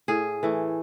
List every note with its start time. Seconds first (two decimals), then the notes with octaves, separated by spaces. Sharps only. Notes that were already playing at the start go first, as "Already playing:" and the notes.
0.08 A2 G#4
0.43 E3 A3